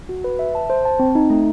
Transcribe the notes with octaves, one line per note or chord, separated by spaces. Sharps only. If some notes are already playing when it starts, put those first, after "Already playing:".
F#4
B4
E5
A5
C5
A5
C4
D#4
A3